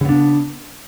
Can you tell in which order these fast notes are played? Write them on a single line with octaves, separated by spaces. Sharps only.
C#3 B3 D4